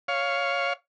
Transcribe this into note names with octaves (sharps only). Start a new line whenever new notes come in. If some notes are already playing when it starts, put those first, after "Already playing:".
C#5 F5